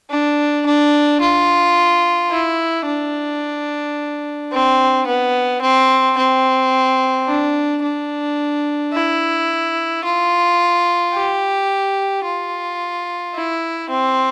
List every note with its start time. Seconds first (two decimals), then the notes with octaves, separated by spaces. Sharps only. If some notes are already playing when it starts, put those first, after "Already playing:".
0.10 D4
0.66 D4
1.21 F4
2.30 E4
2.86 D4
4.52 C4
5.06 B3
5.62 C4
6.17 C4
7.28 D4
7.83 D4
8.93 E4
10.04 F4
11.13 G4
12.25 F4
13.35 E4
13.90 C4